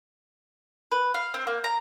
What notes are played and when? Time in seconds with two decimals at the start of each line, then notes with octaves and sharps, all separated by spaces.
0.92 B4
1.14 F5
1.34 C4
1.47 A#3
1.64 A#5